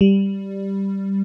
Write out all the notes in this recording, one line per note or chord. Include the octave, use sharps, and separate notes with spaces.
G3